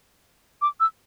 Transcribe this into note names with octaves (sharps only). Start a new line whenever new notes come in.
D6
E6